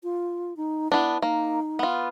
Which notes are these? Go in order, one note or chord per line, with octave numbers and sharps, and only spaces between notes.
F4
D#4
B3 D4 E4
A#3 D#4
B3 F4